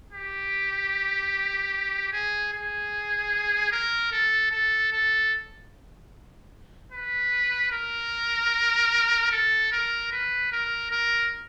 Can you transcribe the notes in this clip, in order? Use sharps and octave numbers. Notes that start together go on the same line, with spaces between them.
G4
G#4
G#4
A#4
A4
A4
A4
B4
A#4
A4
A#4
B4
A#4
A#4